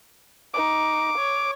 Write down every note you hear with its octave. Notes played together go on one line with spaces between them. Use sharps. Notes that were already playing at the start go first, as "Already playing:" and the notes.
D#4 D6
C#5